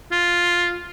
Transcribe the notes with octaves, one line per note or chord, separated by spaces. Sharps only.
F4